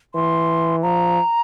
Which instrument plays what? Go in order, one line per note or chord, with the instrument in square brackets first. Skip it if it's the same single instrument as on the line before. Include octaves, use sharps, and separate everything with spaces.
[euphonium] E3 [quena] C6
[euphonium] F3 [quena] A#5